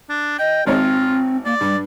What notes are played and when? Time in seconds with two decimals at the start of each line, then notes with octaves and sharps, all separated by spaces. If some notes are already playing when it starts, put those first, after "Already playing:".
0.09 D4
0.39 D#5 G5
0.67 G#1 G#2 C4 F4 C#5
1.45 A#3 D5
1.61 G2 G3